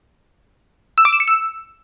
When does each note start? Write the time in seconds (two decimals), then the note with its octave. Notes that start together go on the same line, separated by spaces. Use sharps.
0.98 E6
1.05 D6
1.13 E7
1.20 C#7
1.28 E6